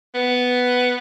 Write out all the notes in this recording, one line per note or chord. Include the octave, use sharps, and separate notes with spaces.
B3